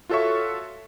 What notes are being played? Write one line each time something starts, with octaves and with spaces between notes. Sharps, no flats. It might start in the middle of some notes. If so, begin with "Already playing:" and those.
F4 F#4 A4 C#5 E5 C#6